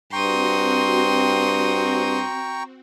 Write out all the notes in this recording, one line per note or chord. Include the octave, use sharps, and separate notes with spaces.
G2 C4 F#4 G5 A#5 C6 C#6 D#6